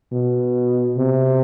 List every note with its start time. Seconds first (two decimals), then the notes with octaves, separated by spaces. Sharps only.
0.12 B2
0.98 C3